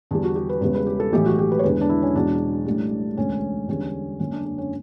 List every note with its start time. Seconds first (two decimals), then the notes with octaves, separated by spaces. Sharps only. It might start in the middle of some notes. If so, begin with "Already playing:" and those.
0.11 E2 D3 G3 D4
0.23 F#4
0.36 G4
0.49 B4
0.61 E1 E2 C#3 G3 B4
0.75 B4
0.87 G4
1.00 A4
1.13 B1 A2 E3 G4
1.26 F#4
1.39 G4
1.51 B4
1.59 C#5
1.64 E1 E2 D3 B4
1.81 D4
1.89 E4
2.02 C#4
2.15 E1 E2 B2 F#3 D4
2.66 A1 A2 G3
3.17 E1 D2 D3 C#4
3.68 E2 D3 G3 C#4
4.20 F#1 F#2 D3 F#3 C#4
4.32 D4
4.46 D4
4.58 C#4